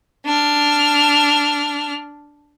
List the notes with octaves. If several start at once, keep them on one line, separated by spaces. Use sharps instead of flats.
D4 F6